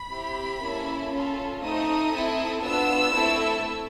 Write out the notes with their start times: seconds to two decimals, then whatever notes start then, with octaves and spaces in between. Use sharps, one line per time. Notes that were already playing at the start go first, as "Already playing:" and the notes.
Already playing: B5
0.09 C4 E4 G4
0.60 A#3 C#4 E4 A4
1.11 C#4 F4 A4
1.62 A3 C4 D#4 D#6
2.12 C4 E4 A4
2.63 B3 D4 F4 E6
3.14 A3 C4 E4 A4